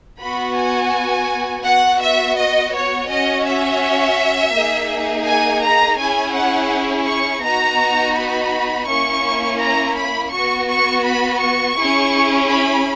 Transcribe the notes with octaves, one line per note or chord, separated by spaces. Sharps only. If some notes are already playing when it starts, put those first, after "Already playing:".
B3 F#4 B5
G#5
B3 F#4 F#5
E5
D#5
C#5
C#4 F#4 D#5
E5
A#3 D#4 G#4
G#5
A#5
C#4 E4 G#4 G#5
F#5
C#6
B3 D#4 F#4 A#5
B5
A#3 C#4 E4 C#6
A#5
B5
B3 F#4 C#6
C#6
B5
C#6
C#4 E4 G#4
B5